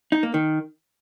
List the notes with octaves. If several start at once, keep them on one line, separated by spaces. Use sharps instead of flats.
D#4
A#3
D#3